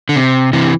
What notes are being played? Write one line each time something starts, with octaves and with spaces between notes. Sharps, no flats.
D3
C3
C3 E3